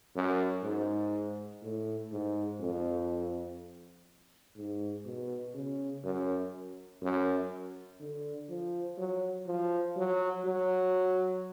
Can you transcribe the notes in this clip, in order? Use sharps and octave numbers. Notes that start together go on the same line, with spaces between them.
F#2
G#2
A2
G#2
F2
G#2
B2
C#3
F#2
F#2
D3
F3
F#3
F3
F#3
F#3